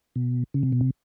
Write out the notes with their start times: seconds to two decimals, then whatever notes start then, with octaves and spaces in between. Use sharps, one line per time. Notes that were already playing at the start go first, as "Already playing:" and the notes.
0.16 B2
0.54 C#3
0.63 C3
0.72 B2
0.81 C3